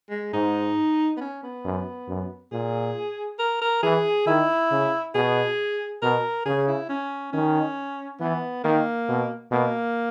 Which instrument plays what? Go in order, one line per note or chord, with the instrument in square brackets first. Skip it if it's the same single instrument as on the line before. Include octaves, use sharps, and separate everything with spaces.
[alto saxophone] G#3
[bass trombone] G#2 [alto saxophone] D#4
[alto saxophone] B3
C#4
B3
[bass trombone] F#2
F#2
[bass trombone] A#2 [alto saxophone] G#4
[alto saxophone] A#4
A#4
[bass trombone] E3 [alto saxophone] G#4
[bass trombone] D#3 [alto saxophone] E4
[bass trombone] C#3
[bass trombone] B2 [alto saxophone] G#4
[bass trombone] B2 [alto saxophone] A#4
[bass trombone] C#3 [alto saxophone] G#4
[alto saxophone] E4
C#4
[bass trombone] D#3 [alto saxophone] C#4
[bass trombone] E3 [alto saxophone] B3
[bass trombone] D#3 [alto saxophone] A#3
[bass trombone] B2
[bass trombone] B2 [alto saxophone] A#3